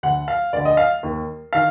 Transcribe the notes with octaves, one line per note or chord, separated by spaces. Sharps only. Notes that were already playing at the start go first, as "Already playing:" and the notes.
D2 D3 F#5
F5
D2 D3 D5
D#5
F5
D#2 D#3
D#3 F5